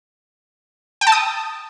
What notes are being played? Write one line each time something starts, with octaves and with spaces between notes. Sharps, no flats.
G5
A5
D#6